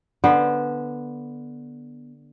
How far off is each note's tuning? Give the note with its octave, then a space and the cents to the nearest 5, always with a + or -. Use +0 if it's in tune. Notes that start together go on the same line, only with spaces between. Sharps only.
D3 +0 B3 -15 C5 +0